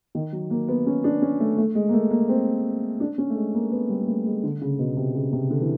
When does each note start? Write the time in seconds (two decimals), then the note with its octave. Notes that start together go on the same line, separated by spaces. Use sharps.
0.15 D#3
0.33 F#3
0.50 A#3
0.68 B3
0.87 C#4
1.04 D4
1.22 C#4
1.40 A3
1.57 A3
1.75 G#3
1.89 A#3
1.93 A3
2.11 A#3
2.29 C4
3.00 D4
3.18 C#4
3.30 A3
3.36 G#3
3.54 A#3
3.72 B3
3.89 G3
4.02 A#3
4.07 A3
4.26 G#3
4.43 D3
4.61 C#3
4.79 B2
4.97 C3
5.15 C#3
5.33 C3
5.50 D3
5.61 E3